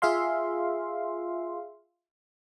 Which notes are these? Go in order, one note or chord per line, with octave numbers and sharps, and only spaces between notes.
F4 G#4 E5 F5 C6